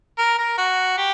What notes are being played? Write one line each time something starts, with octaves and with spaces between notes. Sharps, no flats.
A#4
A#4
F#4
G4